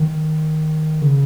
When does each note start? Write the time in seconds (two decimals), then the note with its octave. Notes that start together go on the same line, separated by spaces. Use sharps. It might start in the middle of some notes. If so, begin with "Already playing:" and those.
Already playing: D#3
1.02 C#3